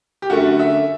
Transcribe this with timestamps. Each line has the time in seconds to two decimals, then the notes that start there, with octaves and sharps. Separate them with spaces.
0.22 G4
0.30 F#2 D3 A3 F#4
0.59 E5